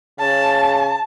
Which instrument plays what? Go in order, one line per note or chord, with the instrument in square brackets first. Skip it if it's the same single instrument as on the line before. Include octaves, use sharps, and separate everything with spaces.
[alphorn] C#3 [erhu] A5